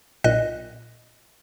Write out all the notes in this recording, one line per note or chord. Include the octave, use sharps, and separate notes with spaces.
B1 A#2 D#5 F#6 A#6